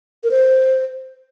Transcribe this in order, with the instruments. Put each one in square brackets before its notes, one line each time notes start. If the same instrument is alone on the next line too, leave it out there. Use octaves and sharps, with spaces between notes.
[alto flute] A#4
C5